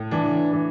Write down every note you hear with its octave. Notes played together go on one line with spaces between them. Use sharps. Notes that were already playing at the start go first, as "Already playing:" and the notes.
Already playing: A2
E3 D4
E3